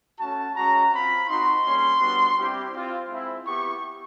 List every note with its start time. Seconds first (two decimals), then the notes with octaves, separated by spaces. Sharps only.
0.18 A3 C#4 F#4 A5
0.55 G#3 C#4 F#4 A#5
0.91 C4 F4 B5
1.27 C4 D#4 F#4 C6
1.63 G3 A#3 C#4
2.00 G3 B3 D4 F#4
2.36 G3 C4 E4 G4
2.72 C4 F4
3.09 G#3 C4 E4
3.45 B3 E4 G4 C#6